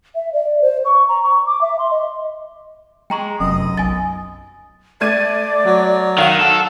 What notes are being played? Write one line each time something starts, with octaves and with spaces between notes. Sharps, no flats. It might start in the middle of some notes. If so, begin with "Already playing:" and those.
E5
D5
C5
C#6
A#5
C#6
D6
E5
C6
D#5
G#3 G5 A#5 C#6
F1 F#2 D#5
B1 G#5 A6
A3 D5 G#6 D#7
F#3
D#3 F5 F#5
A4